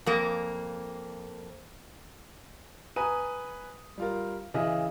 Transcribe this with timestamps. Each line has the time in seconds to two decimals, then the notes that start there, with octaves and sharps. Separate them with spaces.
0.06 F2 A#3
2.96 B4 G#5 A#5 D#6 D#7
3.98 G3 F4 A#4
4.54 C#3 E3 D#5 E5